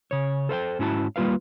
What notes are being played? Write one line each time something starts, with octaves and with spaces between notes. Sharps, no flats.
C#3 C#5
A4 C5 F5 G5
G#2 C#4 E4 F#4 A5
G3 A#3 F4 B4 F5